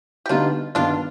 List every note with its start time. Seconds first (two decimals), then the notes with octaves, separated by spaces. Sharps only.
0.26 G4
0.29 D3 G3 B3 D4 D#4 F4
0.75 G2 D#3 B3 D4 F4